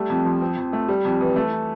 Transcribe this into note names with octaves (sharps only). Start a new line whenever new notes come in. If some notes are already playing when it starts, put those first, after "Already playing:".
Already playing: G3 A3
F2
F3
C4
F2
A3
G3
F2
E3
A3